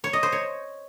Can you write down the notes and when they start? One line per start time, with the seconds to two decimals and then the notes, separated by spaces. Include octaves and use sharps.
0.04 C#5
0.13 D#5
0.23 C5
0.32 C#5